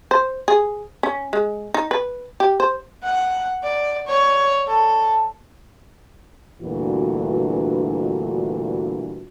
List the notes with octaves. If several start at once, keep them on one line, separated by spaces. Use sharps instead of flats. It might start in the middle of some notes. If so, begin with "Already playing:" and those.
C5
G#4
C#4
G#3
D#4
B4
G4
C5
F#5
D5
C#5
A4
D2 G2 A#2 E3 F4 F#4